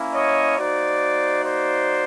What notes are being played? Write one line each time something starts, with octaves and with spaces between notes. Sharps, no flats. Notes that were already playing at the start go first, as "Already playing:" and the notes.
Already playing: A#3 C#4 E4
C#5 D#5
A#3 D#4 F#4 C5 D5
C5 D5